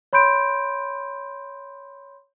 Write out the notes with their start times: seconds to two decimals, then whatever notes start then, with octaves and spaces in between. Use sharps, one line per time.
0.13 C#5 B5 C6 G6 D7